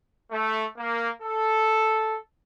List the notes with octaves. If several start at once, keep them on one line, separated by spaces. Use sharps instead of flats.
A3
A#3
A4